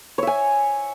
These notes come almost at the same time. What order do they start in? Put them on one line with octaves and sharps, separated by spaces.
C#5 E5 G#5